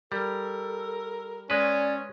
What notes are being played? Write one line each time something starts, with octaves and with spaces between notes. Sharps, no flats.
G3 A4 A#4
G#3 C#4 B4 D5